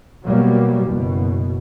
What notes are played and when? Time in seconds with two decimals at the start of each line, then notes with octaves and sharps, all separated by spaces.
0.25 B2 F#3 G3 A#3
0.87 F#1 B2